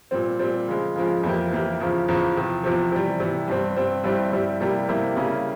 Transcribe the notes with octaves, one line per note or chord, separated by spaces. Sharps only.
A#2 G3 C4
A#2 G3 C4
C#3 F3 G#3
C#3 F3 G#3
F2 E3 A#3 E4 G4
F2 E3 A#3 E4 G4
E2 C#3 F3
E2 C#3 F3
E2 C3 F3
E2 C3 F3
C3 E3 G3
C3 E3 G3
G2 G3 C4
G2 G3 C4
G2 G3 C4 E4 G4
G2 G3 C4 E4 G4
C3 G3 A#3 E4 G4
C3 G3 A#3 E4 G4
C#3 G3 A#3 C#4 E4